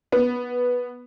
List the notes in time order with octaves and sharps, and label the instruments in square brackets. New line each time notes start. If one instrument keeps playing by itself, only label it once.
[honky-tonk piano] B3